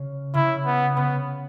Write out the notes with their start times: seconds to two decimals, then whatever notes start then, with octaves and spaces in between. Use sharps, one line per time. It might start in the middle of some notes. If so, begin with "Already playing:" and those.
Already playing: C#3
0.34 C#3 E4
0.66 B3
0.96 C#3 B3